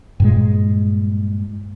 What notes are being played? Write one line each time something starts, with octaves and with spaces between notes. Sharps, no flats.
G2 A#2 G#3